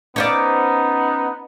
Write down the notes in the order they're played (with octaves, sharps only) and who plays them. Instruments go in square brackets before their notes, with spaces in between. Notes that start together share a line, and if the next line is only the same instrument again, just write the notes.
[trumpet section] B3 D#4 [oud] C#4 C5 D5